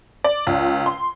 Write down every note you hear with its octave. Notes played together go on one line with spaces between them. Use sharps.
D5
C#2
C6